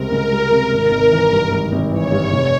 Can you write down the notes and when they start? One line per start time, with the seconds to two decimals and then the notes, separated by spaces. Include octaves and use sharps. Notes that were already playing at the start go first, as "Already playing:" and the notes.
Already playing: C#2 C3 G3 C4 A#4
0.12 C#2
0.31 G3
0.51 C3
0.72 G#1 A#4
0.91 G#1
1.12 E3
1.32 G2
1.52 G#1
1.72 G#1
1.91 E3 C#5
2.12 G2
2.33 F1